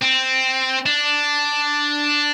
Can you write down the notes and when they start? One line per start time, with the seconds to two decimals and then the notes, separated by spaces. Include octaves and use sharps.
0.02 C4
0.86 D4